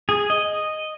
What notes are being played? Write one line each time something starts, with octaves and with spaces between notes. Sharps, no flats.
G#4
D#5